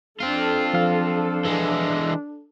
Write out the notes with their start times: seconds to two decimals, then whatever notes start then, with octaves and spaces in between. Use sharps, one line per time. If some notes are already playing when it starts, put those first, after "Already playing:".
0.20 C4 D4 F4 A4
0.73 F3 F5
1.45 E3 G#3